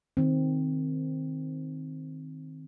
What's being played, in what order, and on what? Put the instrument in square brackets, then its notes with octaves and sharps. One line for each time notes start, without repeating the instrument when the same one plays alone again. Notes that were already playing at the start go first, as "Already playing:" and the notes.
[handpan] D#3 C4